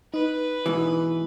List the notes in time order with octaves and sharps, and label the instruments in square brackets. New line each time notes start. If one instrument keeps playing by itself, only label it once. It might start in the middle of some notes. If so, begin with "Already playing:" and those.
[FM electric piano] D#4 [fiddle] B4
[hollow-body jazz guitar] G#2 B2 E3